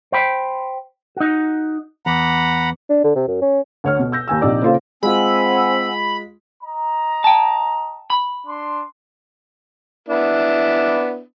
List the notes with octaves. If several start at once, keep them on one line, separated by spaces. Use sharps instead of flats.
C5 G5 B5
D#4 F#4
E2 F#5 A#5 B5
D4
D3
C3
F#2
C#4
D2 C#5 F6
B2
E6 G6 A#6
D#2 G#5 E6
A#1 C3 D#4 D5 E6
C#3 A#3 F4 A4 C5
G#3 C4 F4 F#5 G#5 B5 E6
D#5 A#5
G5 A5
B5
D4 C6
B3 D4 E4